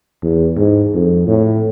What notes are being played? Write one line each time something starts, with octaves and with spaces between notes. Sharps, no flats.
E2
G#2
F2
A2